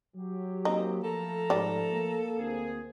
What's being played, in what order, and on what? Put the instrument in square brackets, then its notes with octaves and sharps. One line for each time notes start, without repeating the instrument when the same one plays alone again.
[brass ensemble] F#3 G4
[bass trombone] A#3 [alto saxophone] C4 [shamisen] D#4
[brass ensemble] F3 A3 A#5 [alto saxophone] A4
[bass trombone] G#2 [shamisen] G3 D5
[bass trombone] A#3
[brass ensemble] D2 C4 G#4